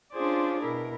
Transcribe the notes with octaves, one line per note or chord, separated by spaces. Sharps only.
C#4 D4 F4 G#4 C5 D5
B2 E4 A#4